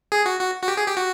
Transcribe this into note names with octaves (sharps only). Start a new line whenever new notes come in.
G#4
F#4
F#4
F#4
G4
G#4
G4
F#4